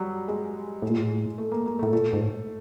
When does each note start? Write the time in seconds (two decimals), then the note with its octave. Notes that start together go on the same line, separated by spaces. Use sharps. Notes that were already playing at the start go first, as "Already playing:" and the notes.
Already playing: F#3 G3
0.28 G#3
0.82 A2
0.90 A#2
0.97 A2
1.38 A3
1.52 A#3
1.66 A#3
1.79 A2 A3
1.92 A#2 A3
2.13 G#2
2.21 A2